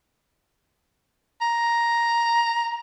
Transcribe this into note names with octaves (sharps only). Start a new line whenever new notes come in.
A#5